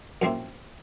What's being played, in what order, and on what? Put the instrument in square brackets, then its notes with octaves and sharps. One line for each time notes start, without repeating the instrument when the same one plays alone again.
[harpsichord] F#2 A#2 F3 A#3 C4 E4